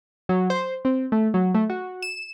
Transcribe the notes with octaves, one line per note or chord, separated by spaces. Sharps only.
F#3
C5
C4
A3
F#3
A3
F#4
E7